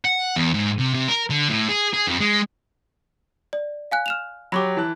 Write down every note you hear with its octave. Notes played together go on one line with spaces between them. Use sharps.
F#5
E2
G#2
C3
C3
A#4
D3
A2
G#4
G#4
F2
G#3
D5
F5 G#5 F#6
F6 E7 F7
F#3 G4 B5 C#6 D6
E3 A5 F#6